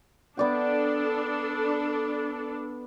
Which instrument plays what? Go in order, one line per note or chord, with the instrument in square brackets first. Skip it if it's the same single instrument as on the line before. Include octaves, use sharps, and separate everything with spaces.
[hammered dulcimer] B3 D5 G5 [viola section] D4 A4